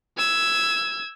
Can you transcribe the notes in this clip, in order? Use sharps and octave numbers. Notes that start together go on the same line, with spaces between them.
E6 G#6